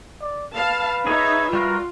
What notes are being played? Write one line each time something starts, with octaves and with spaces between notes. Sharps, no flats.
D5
B4 F5 A5
D#4 G#4 C#5 E5
G3 F4 F#4 A#4